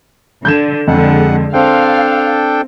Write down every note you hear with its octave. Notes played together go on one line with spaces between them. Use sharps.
D3 G6 G#6 E7
F2 D3 G#3 F#5
C4 D4 A4 F5 G5